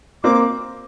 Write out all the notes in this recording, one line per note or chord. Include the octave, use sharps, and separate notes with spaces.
A#3 C4 D6